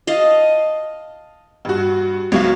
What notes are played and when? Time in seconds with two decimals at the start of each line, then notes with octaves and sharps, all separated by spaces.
0.07 D#5 F5 A5
1.65 G2 F#4
2.32 C#2 F#3 C#5 F5